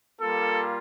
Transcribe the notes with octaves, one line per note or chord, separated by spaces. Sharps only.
G3 A#3 F4 A4